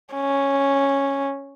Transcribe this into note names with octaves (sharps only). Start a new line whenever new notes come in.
C#4